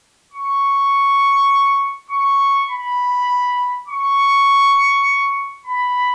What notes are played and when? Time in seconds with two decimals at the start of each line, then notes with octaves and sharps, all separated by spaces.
0.33 C#6
2.11 C#6
2.69 B5
3.88 C#6
5.66 B5